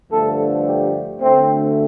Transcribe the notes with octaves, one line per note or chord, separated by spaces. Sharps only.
G2 D3 F3 A3 A4
G4
D2 D3 A3 C4